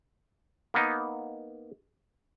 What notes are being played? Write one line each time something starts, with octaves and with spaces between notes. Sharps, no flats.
A#3 B3 D#4